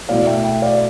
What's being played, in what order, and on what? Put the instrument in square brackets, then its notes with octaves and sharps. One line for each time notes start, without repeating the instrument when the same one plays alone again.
[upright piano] B2 A3 E4 [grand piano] D5 F5
[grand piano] E5 G5
E5 G5
D5 F5